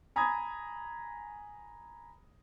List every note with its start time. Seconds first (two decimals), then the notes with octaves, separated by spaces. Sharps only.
0.16 G#5 A#5 B5 D#6 G#6